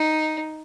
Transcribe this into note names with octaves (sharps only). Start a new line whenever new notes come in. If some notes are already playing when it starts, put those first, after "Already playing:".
Already playing: D#4